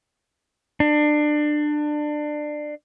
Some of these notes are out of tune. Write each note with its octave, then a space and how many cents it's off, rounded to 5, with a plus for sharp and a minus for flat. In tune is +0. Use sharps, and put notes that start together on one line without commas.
D4 +25